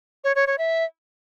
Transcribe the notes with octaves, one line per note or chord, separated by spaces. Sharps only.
C#5
C#5
C#5
E5